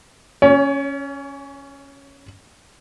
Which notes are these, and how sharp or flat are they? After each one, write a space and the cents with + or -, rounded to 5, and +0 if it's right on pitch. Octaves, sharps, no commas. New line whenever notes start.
C#4 +0 C#5 +35